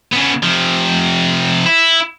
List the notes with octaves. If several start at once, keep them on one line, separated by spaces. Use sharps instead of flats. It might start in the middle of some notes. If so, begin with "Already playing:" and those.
C#3 B3
C3 F3
E4